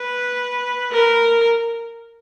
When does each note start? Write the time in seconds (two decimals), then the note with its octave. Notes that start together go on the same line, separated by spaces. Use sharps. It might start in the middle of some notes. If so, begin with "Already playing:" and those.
Already playing: B4
0.92 A#4